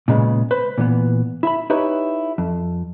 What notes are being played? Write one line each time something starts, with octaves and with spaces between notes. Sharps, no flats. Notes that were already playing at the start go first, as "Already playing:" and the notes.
A#2 C#3 G#3 B3
B4 C5
A#2 E3 B3
E4 E5 B5
D#4 E4 G4 B4 C#5
F2